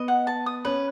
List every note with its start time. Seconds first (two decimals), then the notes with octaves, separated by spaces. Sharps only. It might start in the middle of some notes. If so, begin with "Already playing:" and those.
Already playing: B3 D#5
0.08 F#5
0.27 A5
0.46 D#6
0.65 C#4 B4